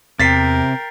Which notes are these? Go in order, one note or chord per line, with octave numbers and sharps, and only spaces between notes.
E2 C3 A#4 G5 A6 B6 C7